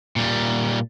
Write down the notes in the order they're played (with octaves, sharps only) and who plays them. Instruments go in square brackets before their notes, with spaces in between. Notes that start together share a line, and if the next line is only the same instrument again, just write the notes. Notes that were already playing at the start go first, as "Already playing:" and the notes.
[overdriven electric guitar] A#2 G3